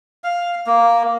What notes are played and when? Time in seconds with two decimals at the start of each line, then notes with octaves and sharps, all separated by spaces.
0.24 F5
0.67 A#3